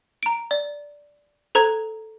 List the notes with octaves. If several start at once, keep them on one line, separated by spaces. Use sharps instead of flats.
A#5 D7
D5
A4 C5 A#5 G#6